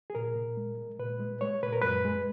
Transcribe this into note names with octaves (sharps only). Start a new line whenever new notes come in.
G#4
A#2 A#4
A#2
G#3
G#3
A#2 B4
G#3
G#3 C#5
A#2 B4
A#4
F#2 B4
G#3